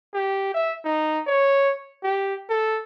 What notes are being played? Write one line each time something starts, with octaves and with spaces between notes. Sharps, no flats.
G4
E5
D#4
C#5
G4
A4